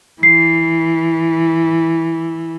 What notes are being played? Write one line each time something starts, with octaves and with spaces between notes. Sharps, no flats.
E3 C7